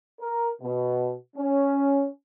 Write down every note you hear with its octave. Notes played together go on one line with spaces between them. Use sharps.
A#4
B2
C#4